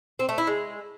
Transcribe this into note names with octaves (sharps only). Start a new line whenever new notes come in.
C4
A3
E4
G#3